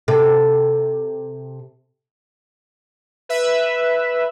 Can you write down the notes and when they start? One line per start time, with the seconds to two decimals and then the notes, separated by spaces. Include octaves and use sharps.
0.08 C3 A4
3.29 B4 E5